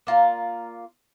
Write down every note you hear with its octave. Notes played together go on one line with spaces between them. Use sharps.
A#3 F4 A#4 D5